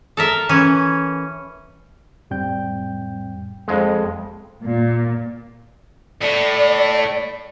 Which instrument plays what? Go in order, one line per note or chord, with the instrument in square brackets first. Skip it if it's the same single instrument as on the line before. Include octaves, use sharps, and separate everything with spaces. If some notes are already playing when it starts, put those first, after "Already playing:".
[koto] A4 A#4 E5
E3 C#4
[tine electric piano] F2 A2 G3 C4 G5 G6
[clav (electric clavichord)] F2 G#3
[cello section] A#2
[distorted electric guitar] A2 [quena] D5